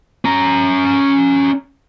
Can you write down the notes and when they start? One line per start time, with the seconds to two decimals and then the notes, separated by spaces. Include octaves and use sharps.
0.25 C#4 A#5